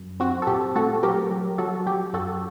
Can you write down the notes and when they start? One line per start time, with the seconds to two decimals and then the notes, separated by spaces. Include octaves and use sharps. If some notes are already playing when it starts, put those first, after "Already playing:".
Already playing: F#2
0.20 C4 F#4
0.42 A4
0.47 A#2 G4
0.76 A3 F#4 A4
1.03 F#3 G4 A#4
1.31 F#3
1.58 F#3 F#4 A4
1.87 F#3 G4
2.13 F#2 F#4 A4